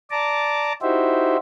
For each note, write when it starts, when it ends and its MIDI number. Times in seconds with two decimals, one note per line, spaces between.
0.11 0.72 74
0.11 0.72 81
0.11 0.72 82
0.11 0.72 86
0.82 1.37 63
0.82 1.37 64
0.82 1.37 66
0.82 1.37 67
0.82 1.37 72
0.82 1.37 76